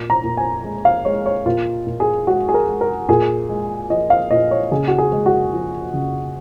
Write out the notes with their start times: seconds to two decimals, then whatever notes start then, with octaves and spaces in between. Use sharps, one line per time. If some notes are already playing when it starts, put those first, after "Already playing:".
Already playing: A#2
0.10 A#5
0.24 A#2
0.37 G#5
0.64 G#3
0.85 F5
1.05 G#3 C#5
1.26 C#5
1.46 A#2 F4
1.87 A#2
2.00 G#4
2.27 G#3 F#4
2.49 G#4
2.54 A#4
2.68 G#3
2.81 A#4
3.09 A#2 G#4
3.49 G#3
3.90 F3 D#5
4.10 F5
4.31 A#2 D#5
4.51 C#5
4.71 C#3 G#4
4.88 F#4
4.98 G#4
5.12 G#3
5.26 F#4
5.53 F3
5.93 C#3